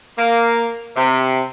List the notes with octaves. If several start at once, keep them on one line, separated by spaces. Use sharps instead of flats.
A#3
C3